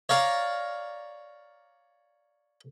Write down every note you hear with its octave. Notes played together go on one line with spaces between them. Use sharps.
C#5 D5 F5 A#5